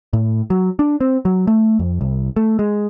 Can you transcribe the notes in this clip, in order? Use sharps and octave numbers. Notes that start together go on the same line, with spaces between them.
A2
F#3
D4
C4
F#3
A3
F2
C2
A3
G#3